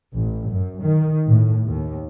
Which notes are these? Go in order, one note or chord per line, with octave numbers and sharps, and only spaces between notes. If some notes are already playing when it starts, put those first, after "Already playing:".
A1
F#2
D#3
A2
D#2